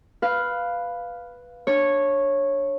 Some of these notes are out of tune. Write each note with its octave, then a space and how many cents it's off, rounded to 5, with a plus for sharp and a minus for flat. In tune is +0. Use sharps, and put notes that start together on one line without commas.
B4 +0 F5 +0
D4 +0 C#5 -10